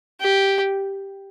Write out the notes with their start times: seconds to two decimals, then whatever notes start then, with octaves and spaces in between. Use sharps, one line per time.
0.20 G4